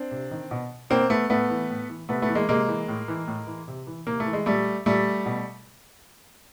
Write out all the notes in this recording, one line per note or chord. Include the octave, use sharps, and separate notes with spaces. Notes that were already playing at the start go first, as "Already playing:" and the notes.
Already playing: C4 D4
C3
D#3
B2
B2 A#3 C4
A3 B3
A2 A3 B3
E3
A2
E3
C3 A3 B3
A3 B3
E3
G#3 A#3
C3 G#3 A#3
E3
A2
E3
A2
E3
C3
E3
C3 A#3
A3
E3
G#3
A#2 G3 A3
A#2 G3 A3
B2